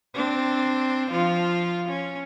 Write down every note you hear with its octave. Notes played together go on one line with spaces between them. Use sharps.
C4 D4
F3 F4
C#4